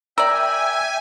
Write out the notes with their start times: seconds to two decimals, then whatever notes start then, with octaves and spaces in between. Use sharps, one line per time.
0.18 A#4 D5 E5 G5 G#5 E6